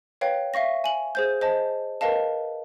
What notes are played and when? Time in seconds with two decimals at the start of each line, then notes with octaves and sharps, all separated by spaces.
0.21 B4 C#5 F5 G5
0.54 E5 F5 C#6 A#6
0.84 G#5 F#7
1.15 G#4 C5 G6
1.41 C5 D#5 A5
2.01 A#4 B4 D#5 F5 A5